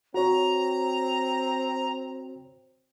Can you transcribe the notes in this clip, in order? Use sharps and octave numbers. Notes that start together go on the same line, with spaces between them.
C4 F#4 C#5 A#5